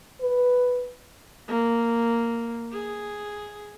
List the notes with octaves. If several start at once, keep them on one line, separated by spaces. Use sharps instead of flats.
B4
A#3
G#4